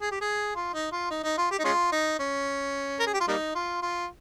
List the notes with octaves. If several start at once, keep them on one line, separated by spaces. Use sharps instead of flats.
G#4
G4
G#4
F4
D#4
F4
D#4
D#4
F4
G4
D#4
G#3 C#4 F4
D#4
C#4
A#4
G#4
G4
F4
G3 A#3 D#4
F4
F4